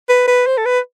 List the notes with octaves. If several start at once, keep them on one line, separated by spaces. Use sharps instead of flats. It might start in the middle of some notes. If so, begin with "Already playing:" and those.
B4
B4
C5
A4
B4